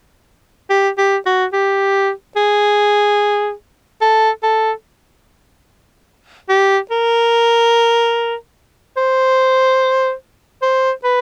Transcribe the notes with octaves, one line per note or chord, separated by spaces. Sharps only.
G4
G4
F#4
G4
G#4
A4
A4
G4
A#4
C5
C5
B4